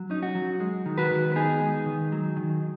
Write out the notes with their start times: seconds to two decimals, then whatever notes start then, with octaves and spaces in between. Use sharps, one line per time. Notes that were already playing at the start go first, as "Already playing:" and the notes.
Already playing: F#3
0.10 C#4 D#4
0.23 F#4
0.35 F#3
0.60 G#3
0.86 D#3
0.98 F#4 B4
1.11 D#3
1.32 B4
1.35 B3 D#4 G#4
1.61 G#3
1.86 D#3
2.12 F#3
2.37 D#3